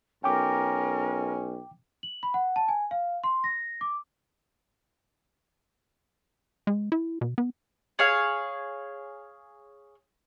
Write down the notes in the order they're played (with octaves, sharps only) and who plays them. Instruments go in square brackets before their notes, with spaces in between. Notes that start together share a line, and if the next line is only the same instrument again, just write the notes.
[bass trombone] B1 [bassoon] C#4 [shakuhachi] A#4 [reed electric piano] G5 D6
[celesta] F#7
B5
F#5
A5
G#5
F5
C6
A#6
D6
[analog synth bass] G#3
E4
B2
B3
[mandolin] G#4 C#5 F5